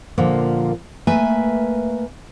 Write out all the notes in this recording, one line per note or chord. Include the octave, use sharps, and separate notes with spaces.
A#2 D3 F3 A#3
A3 A#3 B4 E5 G#5